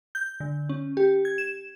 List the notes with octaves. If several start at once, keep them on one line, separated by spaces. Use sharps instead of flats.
G6
D3
C#4
G4
G#6
E7